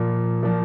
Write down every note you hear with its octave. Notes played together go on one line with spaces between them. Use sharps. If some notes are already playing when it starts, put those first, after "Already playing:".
Already playing: A#2 F3
A#2 F3